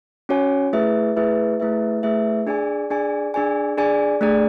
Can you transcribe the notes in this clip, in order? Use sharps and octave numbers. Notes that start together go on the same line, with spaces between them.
C#4 F#4 C#5 G#5
A3 E4 G#4 B4 E5
A3 E4 G#4 B4 E5
A3 E4 G#4 B4 E5
A3 E4 G#4 B4 E5
D4 G#4 D5 G#5
D4 G#4 D5 G#5
D4 G#4 D5 G#5
D4 G#4 D5 G#5
A3 D4 G#4 D5